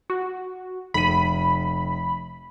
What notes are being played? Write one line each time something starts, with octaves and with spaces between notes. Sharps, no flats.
F#4
F1 B5 D#7